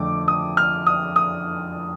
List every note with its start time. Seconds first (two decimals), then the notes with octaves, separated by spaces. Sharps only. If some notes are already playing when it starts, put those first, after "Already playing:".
Already playing: F2 D3 A3 D6
0.28 D#6
0.57 F6
0.87 D#6
1.16 D#6